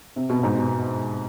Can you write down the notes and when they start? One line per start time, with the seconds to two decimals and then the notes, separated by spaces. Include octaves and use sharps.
0.16 C3
0.30 B2
0.43 G#2
0.57 B2